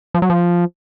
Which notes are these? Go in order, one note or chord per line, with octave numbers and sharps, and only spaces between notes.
F3
F#3
F3